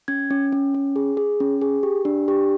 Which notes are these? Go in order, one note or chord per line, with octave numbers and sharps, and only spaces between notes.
C#4 G#6
C#4
C#4
C#4
G#4
G#4
C#4
G#4
G4
D4
G4